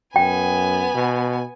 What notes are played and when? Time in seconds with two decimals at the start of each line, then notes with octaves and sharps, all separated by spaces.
0.16 F#2 B3 G5 G#5
0.94 B2